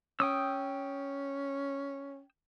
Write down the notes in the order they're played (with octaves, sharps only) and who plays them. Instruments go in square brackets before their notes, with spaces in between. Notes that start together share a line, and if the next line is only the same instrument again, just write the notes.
[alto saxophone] C#4 [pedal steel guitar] G5 D#6 E6